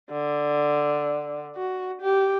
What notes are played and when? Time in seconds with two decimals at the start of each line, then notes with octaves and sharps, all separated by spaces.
0.12 D3
1.56 F#4
2.02 G4